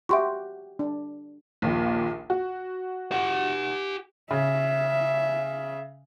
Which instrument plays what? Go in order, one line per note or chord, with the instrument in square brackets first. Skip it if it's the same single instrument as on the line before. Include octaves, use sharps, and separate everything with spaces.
[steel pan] F#4 G4 [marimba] E5 C6 C#6
[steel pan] D4
[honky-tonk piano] A#1 D#2 A#2
F#4
[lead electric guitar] G4 F#5
[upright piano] C#3 [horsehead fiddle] E5